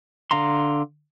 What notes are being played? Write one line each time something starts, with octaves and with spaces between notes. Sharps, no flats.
D3 F5 A#5 C6